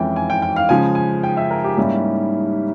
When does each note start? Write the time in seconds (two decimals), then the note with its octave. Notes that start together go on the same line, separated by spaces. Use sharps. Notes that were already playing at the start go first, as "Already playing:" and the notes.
Already playing: F2 E3 G#3 C#4 G5
0.16 G#5
0.30 G5
0.42 G5
0.56 F5
0.69 C#3 F3 G#3 G#5
0.95 G#5
1.24 G5
1.37 E5
1.50 A#4
1.64 G4
1.77 G#2 G3 A#3 C#4 E4 G4